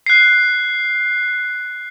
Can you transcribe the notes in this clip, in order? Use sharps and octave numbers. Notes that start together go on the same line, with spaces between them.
F#6 C7